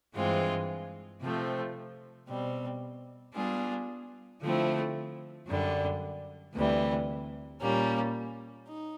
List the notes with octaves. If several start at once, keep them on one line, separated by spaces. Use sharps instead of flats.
G2 E3 G#3 C4 F4
C3 F3 A3 C4
B2 G3 C4
G3 B3 D4 F4 G#4
D3 F3 A3 C4 E4
F#2 D3 G3
D2 C3 E3 G3
A#2 G3 A#3 C#4
D#4